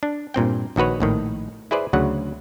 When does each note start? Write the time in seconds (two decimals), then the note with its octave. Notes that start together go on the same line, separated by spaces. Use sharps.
0.03 D4
0.34 G2 A#2 C4 G5
0.76 A#1 D#3 F#4 B4 C#5
1.00 A#1 A2 D#3
1.71 E4 G#4 B4 C5 D5
1.93 D2 C#3 F#3 F#5